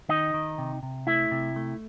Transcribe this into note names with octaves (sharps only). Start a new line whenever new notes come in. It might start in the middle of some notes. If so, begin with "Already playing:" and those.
D#3 D#4 D#5
D#3
C3
C3
A3 E4 E5
C3
A3